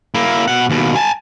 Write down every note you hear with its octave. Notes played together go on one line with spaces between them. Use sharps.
A#3 E4
B2 F#5
D#2 B2
G#5 A5